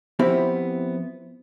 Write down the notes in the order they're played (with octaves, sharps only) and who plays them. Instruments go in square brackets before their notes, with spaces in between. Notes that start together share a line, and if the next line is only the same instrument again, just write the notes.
[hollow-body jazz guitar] F3 B3 C4 E4 G4 E5